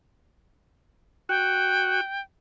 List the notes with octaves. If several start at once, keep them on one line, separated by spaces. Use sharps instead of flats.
F#4 G5